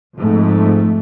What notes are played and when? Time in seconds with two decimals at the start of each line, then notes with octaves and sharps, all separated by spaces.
0.17 F2 G#2 A3